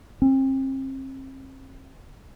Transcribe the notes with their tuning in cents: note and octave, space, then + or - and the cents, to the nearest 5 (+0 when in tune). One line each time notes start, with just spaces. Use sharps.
C4 +35